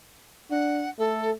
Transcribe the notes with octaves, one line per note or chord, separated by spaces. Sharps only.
D4 F#5
A3 A4